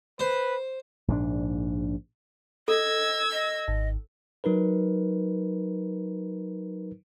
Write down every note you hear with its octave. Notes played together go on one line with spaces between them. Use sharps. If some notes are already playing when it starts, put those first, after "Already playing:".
B4 C5
A#1 G#2 F3 D4
A4 D#5 E6 G#6
D#5
G#1
F#3 D#4 A#4 B4